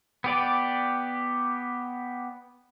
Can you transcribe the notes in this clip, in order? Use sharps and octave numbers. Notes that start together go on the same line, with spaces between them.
B3 G4 D5